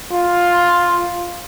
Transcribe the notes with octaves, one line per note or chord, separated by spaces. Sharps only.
F4